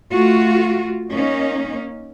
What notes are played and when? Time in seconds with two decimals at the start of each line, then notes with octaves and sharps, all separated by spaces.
0.12 A3 F4 F#4
1.11 A#3 C#4 D#4